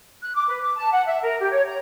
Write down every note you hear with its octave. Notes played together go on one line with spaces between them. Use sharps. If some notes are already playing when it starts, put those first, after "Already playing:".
F#6
D6
B4
D6
A5
F#5
E5
A#4
G4
C#5
A#5